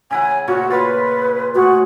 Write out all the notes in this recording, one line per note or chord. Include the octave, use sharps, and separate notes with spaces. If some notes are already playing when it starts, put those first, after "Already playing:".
C#3 E4 F#5 G#5
A#2 C#3 F#4 C#5
F4 B4
A2 F#4 G#4